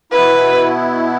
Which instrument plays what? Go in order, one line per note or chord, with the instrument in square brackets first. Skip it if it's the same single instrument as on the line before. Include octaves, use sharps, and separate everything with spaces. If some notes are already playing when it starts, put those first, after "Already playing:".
[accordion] B2 B3 E4 [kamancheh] B4